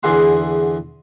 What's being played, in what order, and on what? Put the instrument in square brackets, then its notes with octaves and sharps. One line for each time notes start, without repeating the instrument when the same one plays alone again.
[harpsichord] E2 D3 E3 G#4 F#5 C6